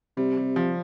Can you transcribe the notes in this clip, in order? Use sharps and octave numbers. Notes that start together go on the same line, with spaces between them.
C3 G3
G3
F3